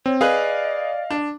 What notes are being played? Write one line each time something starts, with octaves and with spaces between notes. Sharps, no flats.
C4 C#5
G#4 B4 D5 D#5 F5
D4